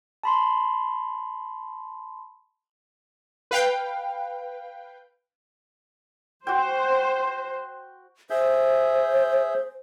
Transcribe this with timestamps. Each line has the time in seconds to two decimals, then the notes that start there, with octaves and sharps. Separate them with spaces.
0.23 A5 B5 C6
3.51 B4 F5 G5
6.47 F#4 C5 G5
8.30 G#4 C5 E5 G6